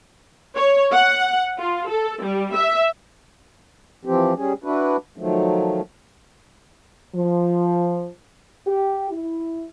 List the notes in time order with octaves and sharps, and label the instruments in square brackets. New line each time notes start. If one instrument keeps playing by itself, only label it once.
[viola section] C#5
F#5
F4
A4
G3
E5
[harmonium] E3 F3 C4 G4
G3 C#4 G#4
D4 E4 F#4 B4
D#3 F3 F#3 A3
[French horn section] F3
G4
E4